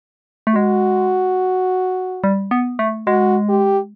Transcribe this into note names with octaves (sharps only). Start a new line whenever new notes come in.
A3
G#3 F#4
G3
B3
A3
G#3 F#4
G4